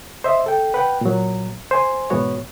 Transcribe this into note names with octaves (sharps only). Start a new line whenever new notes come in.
C5 D#5 E5
A4 G5
B4 F#5 G5
A#2 F#3
C5 G#5
E2 G#2 B2 B3 F#4 C#5